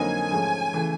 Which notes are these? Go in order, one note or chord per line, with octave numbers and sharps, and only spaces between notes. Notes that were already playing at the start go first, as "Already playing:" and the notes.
Already playing: F2 D3 F#3 A#3 D#4 G#5
G#2 F3 A3 C#4
C#3 E3 A3